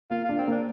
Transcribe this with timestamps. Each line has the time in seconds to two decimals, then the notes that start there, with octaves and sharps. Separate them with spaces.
0.10 A#3 F4
0.24 F4
0.29 D4
0.38 C4
0.47 A#3 D4